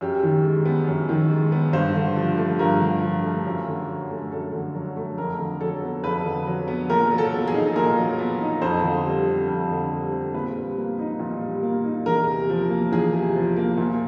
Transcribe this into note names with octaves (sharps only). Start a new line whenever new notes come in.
F#2 G4
D#3
G#3
B3
F#2
D#3
G#3
B3
G2 C5
D3
F3
A3
G2 A#4
D3
F3
A3
F#2
D3
F#3
A3
F#2 A4
D3
F#3
A3
F2 A#4
D3
F#3 A4
B3
F2 B4
D3
F#3
B3
A#2 A#4
F#3
A4
B3
G#4
D#4
A#2 A#4
F#3
B3
D#4
F2 C5
D3
G3
C4
F2
D3
G3
C4
A#2 B4
G3
A#3
D#4
A#2
G3
A#3
D#4
E2 A#4
C3
F3
A#3
E2 G#4
C3
F3
A#3
A#2